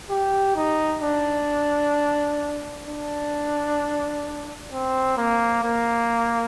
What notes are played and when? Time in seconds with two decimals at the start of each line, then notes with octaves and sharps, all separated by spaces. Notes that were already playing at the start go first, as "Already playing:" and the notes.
0.10 G4
0.56 D#4
1.02 D4
2.87 D4
4.72 C4
5.17 A#3
5.63 A#3